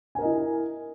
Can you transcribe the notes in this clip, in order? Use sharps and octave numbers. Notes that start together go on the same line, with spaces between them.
E4 A#4 D#5 G#5